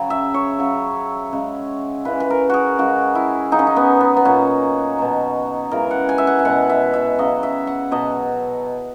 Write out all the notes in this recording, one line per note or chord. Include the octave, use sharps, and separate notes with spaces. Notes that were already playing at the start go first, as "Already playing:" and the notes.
Already playing: C#3 F#3
E5
C#5
C#3 F#3
C#3 G#3
C#3 E3 G#3 B4
B4
A#4
F#4 G#4
C#3 G#3 F#4
E4
C#3 F#3 D#4
C#4
D#4
B3
B3
B3
A#2 F#3 C#4
B2 F#3
C#3 E3 G#3 A#4
F#5
G#5
E5
F#5
E5
B2 G#3 F#5
E5
E5
C#3 F#3 D#5
E5
F#5
B2 F#3 D#5